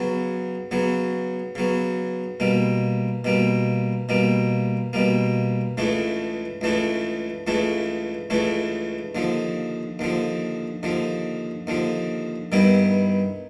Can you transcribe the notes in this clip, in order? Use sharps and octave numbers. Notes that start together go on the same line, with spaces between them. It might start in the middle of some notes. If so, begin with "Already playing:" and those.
Already playing: C#3 F#3 B3
C#3 F#3 B3
C#3 F#3 B3
B2 G3 A#3
B2 G3 A#3
B2 G3 A#3
B2 G3 A#3
C#2 C#3 E3 A3 D4
C#2 C#3 E3 A3 D4
C#2 C#3 E3 A3 D4
C#2 C#3 E3 A3 D4
D#2 D3 F3
D#2 D3 F3
D#2 D3 F3
D#2 D3 F3
G2 D#3 G3 B3 E4